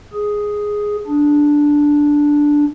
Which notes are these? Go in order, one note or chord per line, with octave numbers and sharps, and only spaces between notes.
G#4
D4